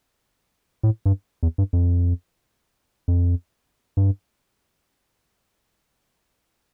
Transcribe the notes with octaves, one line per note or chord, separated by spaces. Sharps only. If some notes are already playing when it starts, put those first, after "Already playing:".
A2
G2
E2
G2
F2
F2
G2